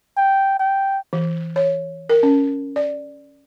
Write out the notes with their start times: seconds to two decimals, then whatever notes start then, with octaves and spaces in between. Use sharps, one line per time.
0.17 G5
0.59 G5
1.13 E3
1.56 C#5
2.09 A#4
2.23 C#4
2.76 D5